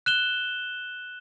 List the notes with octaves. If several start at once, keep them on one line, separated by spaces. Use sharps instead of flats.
F#6 E7 G7